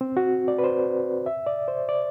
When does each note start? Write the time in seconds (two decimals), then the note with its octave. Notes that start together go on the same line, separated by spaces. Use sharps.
0.01 C4
0.17 F#4
0.48 D5
0.59 B4
0.64 C5
1.26 E5
1.47 D5
1.68 C5
1.89 D5